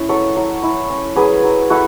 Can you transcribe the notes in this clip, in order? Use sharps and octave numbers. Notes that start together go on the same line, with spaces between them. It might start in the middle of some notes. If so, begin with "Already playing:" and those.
Already playing: C#4 E4 E5
F#3 A4 C#5
F#3
E4
C#4
F#3 G#4 B4
F#3
E4 F#4 A4